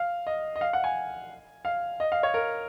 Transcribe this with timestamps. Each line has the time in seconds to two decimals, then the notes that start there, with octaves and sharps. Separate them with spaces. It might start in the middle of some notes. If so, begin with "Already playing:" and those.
Already playing: F5
0.27 D#5
0.56 D#5
0.61 F5
0.73 F#5
0.84 G#5
1.65 F5
2.00 D#5
2.12 F5
2.23 C#5
2.34 A#4